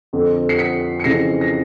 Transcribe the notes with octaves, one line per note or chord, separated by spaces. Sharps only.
F2 D3
C7
B6 C#7
C#7
F2 C#3 E3 A#6 C7
A#6